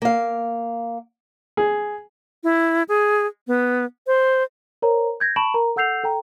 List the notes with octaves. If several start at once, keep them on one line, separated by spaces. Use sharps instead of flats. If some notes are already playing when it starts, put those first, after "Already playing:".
A#3 F5
G#4
E4
G#4
B3
C5
A#4 C5 C#5 A#5
G6 G#6 A#6
A5 B5 C#6 D7 E7 F#7
A#4 A#5
A4 F#5 E6 G6 C7 F7
A4 G5 A#5